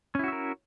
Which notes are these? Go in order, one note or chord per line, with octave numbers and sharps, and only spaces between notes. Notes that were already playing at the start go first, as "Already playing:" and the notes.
C#4 E4 F#4 A#4 E5